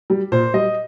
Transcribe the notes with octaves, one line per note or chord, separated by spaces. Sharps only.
G3
A#2 C5
G3 D#5